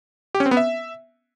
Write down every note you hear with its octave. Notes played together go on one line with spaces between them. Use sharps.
G4
C#4
C4
B3
E5